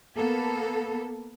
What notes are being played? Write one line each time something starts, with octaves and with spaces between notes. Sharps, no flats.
A#3 B3 A4